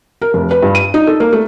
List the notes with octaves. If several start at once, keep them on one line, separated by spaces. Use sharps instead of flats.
A#4
F1
B4
G2
D#7
D#4
A4
A#3
A3